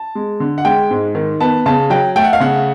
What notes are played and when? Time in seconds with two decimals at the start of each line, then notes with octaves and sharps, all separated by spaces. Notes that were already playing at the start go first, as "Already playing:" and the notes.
Already playing: A5
0.15 G#3
0.40 D3
0.58 F#5
0.65 G#3 G5
0.91 G#2
1.15 D#3
1.40 B3 A5
1.66 C#3 A5
1.90 F#3 G5
2.16 A3 G5
2.24 F#5
2.33 F5
2.40 C#3 F#5